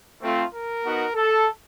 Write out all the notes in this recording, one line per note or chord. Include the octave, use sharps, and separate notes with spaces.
A3 C4 F4
A#4
B3 D#4 F#4
A4